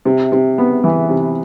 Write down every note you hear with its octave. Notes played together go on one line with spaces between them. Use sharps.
C3
C3
B3
E3
C3